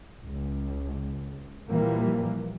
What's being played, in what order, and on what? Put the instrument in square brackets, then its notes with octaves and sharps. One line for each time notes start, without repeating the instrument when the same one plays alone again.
[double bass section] C#2
A#2 E3 F3 G3 A#3